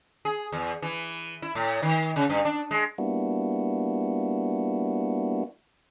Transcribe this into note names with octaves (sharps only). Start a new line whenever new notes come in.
G#4
E2
E3
E4
A2
D#3
C#3
G2
D4
G#3
G3 A#3 B3 D4 E4 F#4